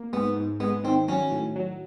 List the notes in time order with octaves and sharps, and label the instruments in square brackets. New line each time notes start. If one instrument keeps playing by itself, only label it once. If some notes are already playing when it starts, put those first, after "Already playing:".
Already playing: [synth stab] A#3
[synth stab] G#2 [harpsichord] B3
[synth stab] G#2
[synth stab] G#3 [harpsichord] B3
[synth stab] D#3 [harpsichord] C4
[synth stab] F#3 [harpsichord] C#4
[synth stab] A2
F#3